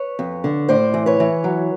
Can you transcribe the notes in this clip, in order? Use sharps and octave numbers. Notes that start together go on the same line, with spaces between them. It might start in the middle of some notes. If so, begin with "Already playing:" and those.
Already playing: B4 C#5
F2
D3
A2 C5 D5
E3
B4 C#5
E3
F#3